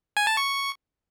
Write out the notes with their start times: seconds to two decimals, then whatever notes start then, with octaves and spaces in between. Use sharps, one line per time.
0.17 G#5
0.27 A5
0.37 C#6